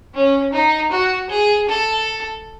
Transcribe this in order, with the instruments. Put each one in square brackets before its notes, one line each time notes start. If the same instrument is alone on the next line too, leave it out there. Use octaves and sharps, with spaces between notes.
[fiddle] C#4
D#4
F#4
G#4
A4